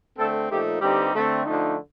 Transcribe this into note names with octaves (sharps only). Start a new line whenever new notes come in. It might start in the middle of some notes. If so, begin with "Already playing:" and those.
D3 A3 C4 A4
A#2 F3 A3 D#4 G4
G2 D3 G3 C4 D#4 G4
D3 A3 C4
D3 F3 A3 D#4